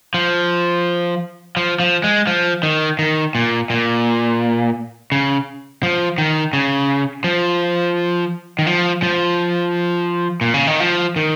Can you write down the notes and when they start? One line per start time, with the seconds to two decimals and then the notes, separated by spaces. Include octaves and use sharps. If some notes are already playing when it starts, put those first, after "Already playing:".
0.14 F3
1.57 F3
1.80 F3
2.04 G#3
2.27 F3
2.63 D#3
2.99 D#3
3.35 A#2
3.70 A#2
5.12 C#3
5.83 F3
6.18 D#3
6.53 C#3
7.24 F3
8.59 D#3
8.67 F3
9.03 F3
10.41 A#2
10.54 C#3
10.67 D#3
10.80 F3
11.16 D#3